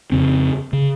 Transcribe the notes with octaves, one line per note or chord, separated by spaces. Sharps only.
F2 C#3 C4
C#3